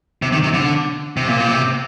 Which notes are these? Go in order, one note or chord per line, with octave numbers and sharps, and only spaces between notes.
C3
D#3
C3
D3
C3
A#2
C3